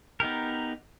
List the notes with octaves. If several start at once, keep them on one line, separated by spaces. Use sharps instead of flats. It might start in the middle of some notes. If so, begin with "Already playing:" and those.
B3 D#4 G4 A#4